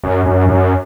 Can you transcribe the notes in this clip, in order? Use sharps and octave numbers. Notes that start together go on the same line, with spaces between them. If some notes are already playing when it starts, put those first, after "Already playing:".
F#2
F#2
F#2